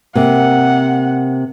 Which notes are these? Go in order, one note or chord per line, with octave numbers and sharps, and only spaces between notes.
C3 A#3 F#5